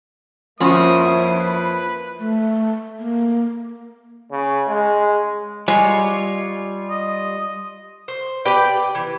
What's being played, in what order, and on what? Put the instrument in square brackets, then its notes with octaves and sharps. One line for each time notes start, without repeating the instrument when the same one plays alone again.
[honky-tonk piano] F2 [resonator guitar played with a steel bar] F3 C#4 F#4 [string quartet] A#3 E4 C5 [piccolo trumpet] D#6
[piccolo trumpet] B4
[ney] A3
A#3
[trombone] C#3
G#3
[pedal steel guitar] G3 F4 C#5 [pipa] G#3
[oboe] D#5
[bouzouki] C5
G4 B4 D5 G5
E3